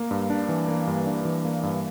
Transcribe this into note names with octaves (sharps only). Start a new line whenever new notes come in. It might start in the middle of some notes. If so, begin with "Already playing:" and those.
Already playing: A#3
G2
D4
E3
A#3
G2
D4
E3
A#3
G2